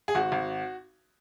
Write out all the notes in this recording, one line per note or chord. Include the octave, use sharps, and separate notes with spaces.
G#4
G#1 F#4
G#1